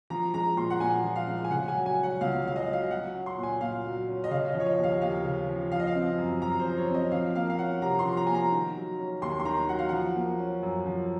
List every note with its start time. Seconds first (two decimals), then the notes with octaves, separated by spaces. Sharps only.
0.10 F3 A#5
0.34 G#3 A#5
0.57 A#2 C6
0.70 F#5
0.80 A#2 G#5
1.04 F3
1.16 F5
1.28 G#3
1.45 G#5
1.51 C#3 F#5
1.68 G#5
1.74 F#3
1.86 G#5
1.98 C#4
2.03 F#5
2.21 C#2 F5
2.44 C#3 F5
2.56 D#5
2.67 F#3
2.73 F5
2.91 F#3 F#5
3.14 C#4
3.26 C6
3.38 A#2
3.43 G#5
3.61 A#2 F5
3.85 F#3
4.08 C#4
4.24 D#5
4.31 C#3 F5
4.49 D#5
4.55 F3
4.60 C#5
4.66 D#5
4.78 D#2
4.84 F5
5.02 D#2 F5
5.25 C#3
5.48 F3
5.72 F3 F5
5.80 D#5
5.87 F5
5.95 C4
6.18 F#2
6.42 F#2 A#5
6.59 C5
6.65 F3
6.77 C#5
6.88 C4
6.94 D#5
7.12 F3 F5
7.35 A#3 F5
7.50 F5
7.58 C#4 F#5
7.82 C3 A#5
7.99 C6
8.05 F3
8.17 A#5
8.27 A#3 G#5
8.35 A#5
8.52 D#3
8.76 F#3
8.99 C#4
9.22 D#2 C6
9.40 C6
9.45 D#3 A#5
9.69 F#3 F#5
9.79 F5
9.89 F3 F#5
10.16 A#3
10.39 C#4
10.63 F#2
10.86 F3